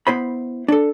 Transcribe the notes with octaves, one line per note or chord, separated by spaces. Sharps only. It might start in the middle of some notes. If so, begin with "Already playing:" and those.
B3 E4 C5 B5
D4 A4